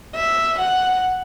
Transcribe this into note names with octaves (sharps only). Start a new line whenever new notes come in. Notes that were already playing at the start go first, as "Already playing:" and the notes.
E5
F#5